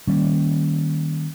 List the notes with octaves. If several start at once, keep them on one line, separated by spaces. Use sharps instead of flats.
D#3 G3 A#3 C#4